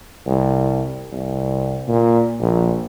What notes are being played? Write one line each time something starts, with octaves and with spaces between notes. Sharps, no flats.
C2
C2
A#2
A#1